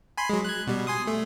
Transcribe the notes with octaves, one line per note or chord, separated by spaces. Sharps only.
G#5 B5 C6
F#3 G#3
F#6 G#6
B2 G3
G#5 C6 D#6
A3